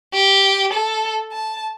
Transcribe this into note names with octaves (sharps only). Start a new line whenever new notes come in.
G4
A4
A5